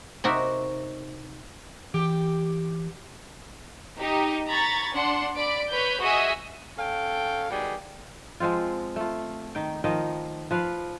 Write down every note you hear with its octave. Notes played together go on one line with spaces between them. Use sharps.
C3 D#4 F#4 A#4 E5
E3 G4
D#4 G4
A#5 B5 C#6 G#6 A6
D4 F#5 C6
D5 B5 D7
B4 C#5 B5 G6
F#4 G#4 D#5 E5 G#5
C#4 A4 F5 G5
B2 D#3 G3 G#4
F3 G#3 C4 F4
A3 F4
D#3 G5
D#3 F3 D#5
F3 B4 F5